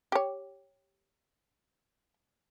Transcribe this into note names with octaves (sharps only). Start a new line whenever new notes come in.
G4 C#5